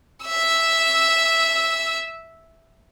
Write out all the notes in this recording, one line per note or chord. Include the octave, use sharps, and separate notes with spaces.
E5 E6